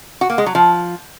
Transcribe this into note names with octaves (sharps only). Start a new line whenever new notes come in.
F#4
A#3
G#3
F#3
F3